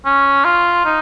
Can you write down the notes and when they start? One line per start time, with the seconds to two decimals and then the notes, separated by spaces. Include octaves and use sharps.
0.05 C#4
0.45 F4
0.85 D#4